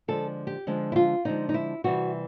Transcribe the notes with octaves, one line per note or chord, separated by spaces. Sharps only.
D3 F3 G#3 A4
G4
D3 F3 G#3
E4
F4
D3 F3 G#3 D#4
D#4
E4
C3 E3 G3 F#4